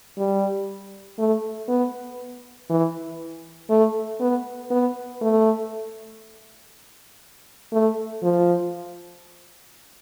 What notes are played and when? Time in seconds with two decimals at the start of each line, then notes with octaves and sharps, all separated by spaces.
0.18 G3
1.19 A3
1.69 B3
2.70 E3
3.70 A3
4.21 B3
4.71 B3
5.21 A3
7.73 A3
8.23 F3